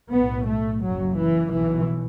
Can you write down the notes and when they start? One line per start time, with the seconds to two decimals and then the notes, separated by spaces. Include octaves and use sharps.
0.12 B1 A2 B3
0.46 A3
0.82 F#1 F#2 F#3
1.16 E3
1.52 B1 B2 E3